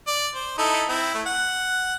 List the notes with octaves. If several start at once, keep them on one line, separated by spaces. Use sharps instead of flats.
D5
C5
D#4 E4 A4
C4 E4
A3
F#5